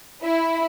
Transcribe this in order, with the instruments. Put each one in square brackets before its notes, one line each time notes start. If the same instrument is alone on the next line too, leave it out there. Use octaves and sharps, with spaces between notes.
[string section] E4